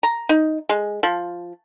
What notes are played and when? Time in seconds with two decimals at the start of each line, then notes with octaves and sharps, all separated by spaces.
0.03 A#5
0.29 D#4
0.69 G#3
1.03 F3